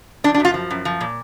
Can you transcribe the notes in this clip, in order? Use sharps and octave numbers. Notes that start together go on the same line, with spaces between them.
F3 D4
D4
F#2 F4
F3
F#2
F3
A#2